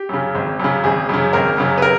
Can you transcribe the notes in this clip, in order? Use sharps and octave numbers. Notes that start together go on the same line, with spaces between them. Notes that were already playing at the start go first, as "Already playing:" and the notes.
Already playing: G4
F#2 C#3
G#1
F#2 C#3
G#1 G#4
F#2 C#3
G#1 A#4
F#2 C#3
B4
A#4